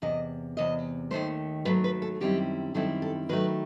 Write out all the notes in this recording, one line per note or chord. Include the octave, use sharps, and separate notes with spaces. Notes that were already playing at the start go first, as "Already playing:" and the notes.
E2 C3 D#5
E2 C3 D#5
D#2 D#3 F#3 A3 C5
D#2 D#3 F#3 A3 B4
B4
A4
F#2 D#3 G3 C4 E4 G4
F#2 D#3 G3 C4 E4 A4
A4
D#3 F#3 A3 B4